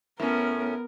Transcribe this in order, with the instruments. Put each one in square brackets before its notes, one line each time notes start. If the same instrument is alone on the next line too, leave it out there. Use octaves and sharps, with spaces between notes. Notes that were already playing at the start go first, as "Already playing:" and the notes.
[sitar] A2 C#4 [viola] B3 A#4